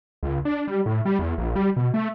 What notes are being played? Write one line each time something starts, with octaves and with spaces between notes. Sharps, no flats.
C#2
D4
G3
A2
G3
E2
A#1
G3
B2
A3